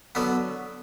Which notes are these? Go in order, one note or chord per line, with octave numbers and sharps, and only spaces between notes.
D3 F#3 B3